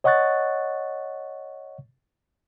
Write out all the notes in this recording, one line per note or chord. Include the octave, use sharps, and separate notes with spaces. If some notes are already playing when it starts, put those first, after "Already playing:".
C#5 D#5 F#5 C#6 F#6 A6